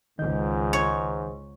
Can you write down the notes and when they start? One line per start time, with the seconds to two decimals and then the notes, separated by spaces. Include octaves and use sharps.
0.19 C#2 G#2 D#3 D#5 G6
0.73 C#5